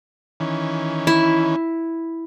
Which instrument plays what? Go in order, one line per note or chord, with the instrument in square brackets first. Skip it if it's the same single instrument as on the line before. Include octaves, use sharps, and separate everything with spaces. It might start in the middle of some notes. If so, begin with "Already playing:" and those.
[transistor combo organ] D#3 E3 C#4
[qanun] E4